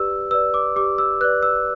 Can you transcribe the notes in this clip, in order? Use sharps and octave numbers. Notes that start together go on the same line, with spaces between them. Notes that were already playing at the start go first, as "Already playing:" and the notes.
Already playing: G4 B4 D5 E6
B4 D5 E6
D6
G4 D6
E6
B4 D5 F#6
E6